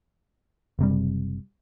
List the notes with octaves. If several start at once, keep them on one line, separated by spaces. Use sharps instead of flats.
F#1 C3 G3